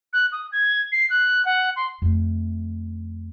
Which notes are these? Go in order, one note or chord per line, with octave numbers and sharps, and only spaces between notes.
F#6
D#6
G#6
C7
F#6
F#5
C6
F2 A3